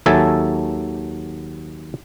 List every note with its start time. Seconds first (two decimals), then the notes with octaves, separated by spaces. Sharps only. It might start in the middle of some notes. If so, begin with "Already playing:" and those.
0.06 D#2 F#3 A4 E5 G#5 A5